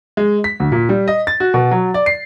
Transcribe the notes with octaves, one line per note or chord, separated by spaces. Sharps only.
G#3
B6
D2
A#2
G3
D#5
A6
F#4
B2
F#3
D5
C7